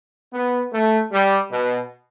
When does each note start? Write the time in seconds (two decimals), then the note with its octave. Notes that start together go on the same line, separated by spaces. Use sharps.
0.33 B3
0.73 A3
1.12 G3
1.51 B2